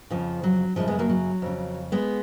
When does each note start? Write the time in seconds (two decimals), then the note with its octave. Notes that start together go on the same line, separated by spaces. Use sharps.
0.10 F2 C#3 F3
0.43 F#3
0.76 F#2 F3 G#3
0.80 C#3
0.87 G#3 B3
0.99 F#3 A#3
1.09 F#3
1.42 F2 C#3
1.92 G#3 B3